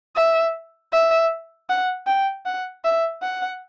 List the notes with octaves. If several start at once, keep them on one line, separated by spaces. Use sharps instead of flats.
E5
E5
F#5
G5
F#5
E5
F#5